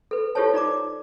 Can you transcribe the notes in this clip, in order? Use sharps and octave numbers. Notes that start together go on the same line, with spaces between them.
A4 B4
F4 G4 A4 C5 C#5 A5
D#4 D5 A#5 D6